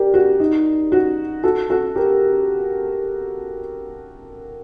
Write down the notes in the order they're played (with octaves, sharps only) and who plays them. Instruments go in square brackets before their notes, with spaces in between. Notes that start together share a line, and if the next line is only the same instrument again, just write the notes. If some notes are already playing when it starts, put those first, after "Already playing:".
Already playing: [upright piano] G4 A#4 D5
F#4
D#4
F#4
F#4 A4
F#4 A4
G4 A#4